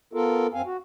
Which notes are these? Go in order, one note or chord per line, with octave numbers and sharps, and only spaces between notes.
B3 F4 A4 A#4
F#2 C4 F5 G#5
F#4